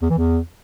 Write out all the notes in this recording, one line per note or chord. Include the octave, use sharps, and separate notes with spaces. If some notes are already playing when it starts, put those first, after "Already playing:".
E2
E3
E2